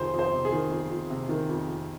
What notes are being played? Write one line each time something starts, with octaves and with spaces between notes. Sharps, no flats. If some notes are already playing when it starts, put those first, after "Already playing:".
Already playing: F2 C3 D#3 G#4 C5
F2
C5
C3
G#4
D#3
F2
F2
C3
D#3
F2
F2